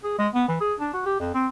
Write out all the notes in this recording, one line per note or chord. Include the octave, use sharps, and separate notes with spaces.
G#4
G#3
B3
E3
G#4
D4
F#4
G4
F2
C4